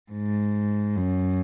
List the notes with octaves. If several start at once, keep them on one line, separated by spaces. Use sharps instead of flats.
G#2
F#2